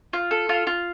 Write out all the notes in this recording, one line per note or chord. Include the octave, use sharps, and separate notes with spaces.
F4
A4
F4
F4